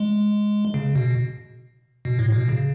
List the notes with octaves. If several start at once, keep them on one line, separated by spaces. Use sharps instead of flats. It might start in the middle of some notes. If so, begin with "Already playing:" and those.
Already playing: G#3
C#3
B2
B2
A2
B2
C#3